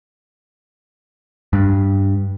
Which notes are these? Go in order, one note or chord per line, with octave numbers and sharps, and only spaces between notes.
G2